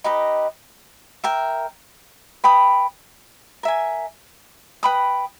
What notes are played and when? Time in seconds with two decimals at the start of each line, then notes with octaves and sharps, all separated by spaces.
0.04 D#4 G4 B4 D#5
1.24 A#4 E5 G5
2.44 B4 G5 B5 D#6
3.63 A#4 E5 G#5
4.83 B4 G5 B5 D#6